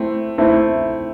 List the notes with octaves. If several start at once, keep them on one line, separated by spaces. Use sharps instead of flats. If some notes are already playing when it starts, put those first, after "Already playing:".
Already playing: A3 C4 E4
A3 C4 E4